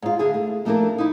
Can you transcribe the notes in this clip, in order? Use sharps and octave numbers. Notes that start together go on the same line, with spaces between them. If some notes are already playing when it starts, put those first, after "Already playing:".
G#2 F4
D3 E4 G#4
A3
F3 A3 A#3 D4 E4 A#4
D#4 E4